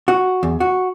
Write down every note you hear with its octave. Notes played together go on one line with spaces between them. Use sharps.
F#4
E2
F#4